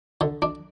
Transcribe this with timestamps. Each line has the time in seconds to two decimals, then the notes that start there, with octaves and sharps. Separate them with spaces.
0.21 D3
0.42 D4